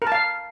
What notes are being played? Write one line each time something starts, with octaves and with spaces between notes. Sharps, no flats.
A#4
A5
F5